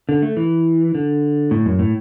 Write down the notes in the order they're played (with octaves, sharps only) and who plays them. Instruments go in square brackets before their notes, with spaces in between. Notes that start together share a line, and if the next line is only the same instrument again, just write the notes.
[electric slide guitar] D3
A3
E3
D3
A2
F#2
A2